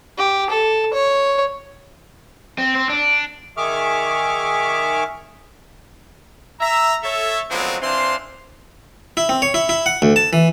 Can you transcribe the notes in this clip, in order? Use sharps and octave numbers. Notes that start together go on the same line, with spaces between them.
G4
A4
C#5
C4
C4
D4
D#3 G#4 E5 C#6 D6 F6
E5 A#5
A4 C#5 E5
D3 F3 F#3 G#3 B3 C4
E3 C4 D4 C5 F5 C6
E4
C4
C#5
E4
E4
F#5
D2
A5
E3